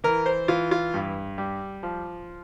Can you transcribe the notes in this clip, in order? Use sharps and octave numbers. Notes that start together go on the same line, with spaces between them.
E3 A#4
C5
E3 F4
F4
G2
G3
F3